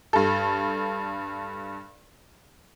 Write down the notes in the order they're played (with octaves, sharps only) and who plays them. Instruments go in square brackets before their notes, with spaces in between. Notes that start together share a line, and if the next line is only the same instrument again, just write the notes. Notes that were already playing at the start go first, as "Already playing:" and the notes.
[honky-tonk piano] G2 A4